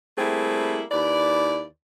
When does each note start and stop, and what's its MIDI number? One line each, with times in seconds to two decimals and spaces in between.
0.18 0.82 55
0.18 0.82 57
0.18 0.82 58
0.18 0.82 60
0.18 0.82 64
0.18 0.82 68
0.91 1.64 39
0.91 1.64 64
0.91 1.64 71
0.91 1.64 74